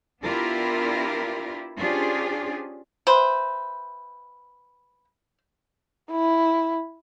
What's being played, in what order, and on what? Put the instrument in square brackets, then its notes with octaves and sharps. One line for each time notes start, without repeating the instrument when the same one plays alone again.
[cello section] B3 D4 E4 F4 G4 A#4
C#4 D4 F4 G4 G#4 C5
[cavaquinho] B4 E5 G5 [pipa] C5
[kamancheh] E4